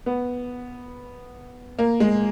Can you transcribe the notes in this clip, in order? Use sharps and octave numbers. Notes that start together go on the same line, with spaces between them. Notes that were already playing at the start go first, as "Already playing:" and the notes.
B3
A#3
G#3